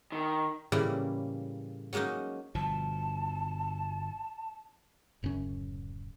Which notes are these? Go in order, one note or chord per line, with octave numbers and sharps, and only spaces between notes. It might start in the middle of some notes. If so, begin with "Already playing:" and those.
D#3
A2 C#3 E3 G3 A#3 E4
F#3 G#3 A#3 C#4 D#4
G1 B2 F3 A5
D1 F#2 C#3 C#4